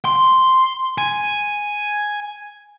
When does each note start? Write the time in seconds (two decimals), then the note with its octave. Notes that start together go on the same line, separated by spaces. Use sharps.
0.05 C6
0.98 G#5